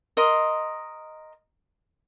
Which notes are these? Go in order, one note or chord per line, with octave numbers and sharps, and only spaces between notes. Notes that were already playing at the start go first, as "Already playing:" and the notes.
A#4 D#5 C6